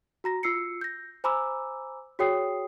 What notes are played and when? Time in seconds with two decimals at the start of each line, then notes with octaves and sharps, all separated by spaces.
0.24 F#4 A#5 A#6
0.43 F4 E6 C7 C#7
0.81 G6 A#6
1.24 C5 G#5 A#5 B5 D6 E6
2.19 F#4 G#4 C#5 G5 D#6 C7